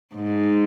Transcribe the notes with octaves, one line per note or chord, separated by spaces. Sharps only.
G#2